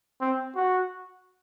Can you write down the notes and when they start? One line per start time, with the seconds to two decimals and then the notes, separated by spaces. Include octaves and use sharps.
0.21 C4
0.56 F#4